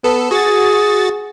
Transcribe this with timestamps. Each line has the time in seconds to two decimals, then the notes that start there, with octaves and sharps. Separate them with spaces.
0.04 B3 A4
0.31 F#4 G#4 A6